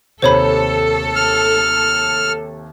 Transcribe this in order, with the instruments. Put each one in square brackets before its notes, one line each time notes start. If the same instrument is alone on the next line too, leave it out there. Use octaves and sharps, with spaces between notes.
[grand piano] D#2 C3 [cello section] A4 [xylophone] C5 C#5 B5
[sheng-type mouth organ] F6